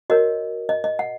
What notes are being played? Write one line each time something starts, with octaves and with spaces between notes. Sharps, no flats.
F#4 A#4 C#5 D#5
D#5
D#5
F#5